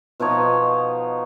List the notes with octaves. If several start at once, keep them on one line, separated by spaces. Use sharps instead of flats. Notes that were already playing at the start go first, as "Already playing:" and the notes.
B2 F3 D#4 C#5